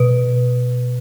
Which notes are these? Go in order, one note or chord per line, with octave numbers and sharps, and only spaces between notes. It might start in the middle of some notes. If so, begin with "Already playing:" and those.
Already playing: B2